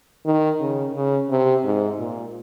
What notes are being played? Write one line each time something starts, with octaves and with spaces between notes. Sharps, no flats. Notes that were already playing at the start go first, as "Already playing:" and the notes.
D#3
C#3
C#3
C3
G#2
A#2